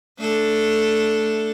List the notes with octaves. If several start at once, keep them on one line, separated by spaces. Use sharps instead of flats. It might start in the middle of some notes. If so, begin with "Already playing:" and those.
A3 D4 A4